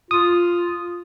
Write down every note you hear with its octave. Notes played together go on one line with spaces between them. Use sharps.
F4 D#6